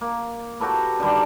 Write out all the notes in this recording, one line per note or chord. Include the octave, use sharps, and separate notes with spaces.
A#3
F#4 G4 A4 B4
D3 D#3 G3